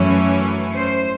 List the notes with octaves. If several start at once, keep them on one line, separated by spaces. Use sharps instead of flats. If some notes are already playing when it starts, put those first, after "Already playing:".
Already playing: F#2 E3 A3 C#4
C5